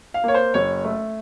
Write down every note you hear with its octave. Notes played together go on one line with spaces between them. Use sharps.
F5
A#3 C#5
C5
F#1 C#5
A3